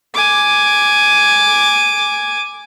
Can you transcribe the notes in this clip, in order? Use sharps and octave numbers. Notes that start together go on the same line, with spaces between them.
G#5 D6